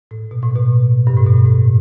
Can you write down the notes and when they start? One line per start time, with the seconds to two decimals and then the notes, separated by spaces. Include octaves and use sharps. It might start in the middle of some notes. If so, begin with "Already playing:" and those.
0.11 A2
0.31 B2
0.43 A2
0.56 B2
1.07 G2
1.17 A2
1.26 B2
1.45 A2